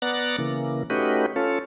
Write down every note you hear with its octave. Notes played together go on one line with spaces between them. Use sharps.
B3 D5 F#5 A#5 F#6 A6
C#3 E3 A#3
A3 C#4 D#4 F#4 G4 B4
C#4 F4 A4